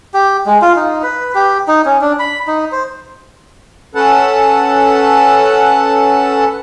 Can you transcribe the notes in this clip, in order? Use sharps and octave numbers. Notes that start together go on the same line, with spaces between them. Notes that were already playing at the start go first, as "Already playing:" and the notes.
G4
G#3
F4
D#4
B4
G4
D#4
C#4
D4
B5
D#4
C5
C#4 A4 B4 F#5 A5